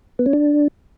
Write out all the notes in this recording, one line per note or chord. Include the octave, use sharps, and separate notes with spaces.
B3
C#4
D4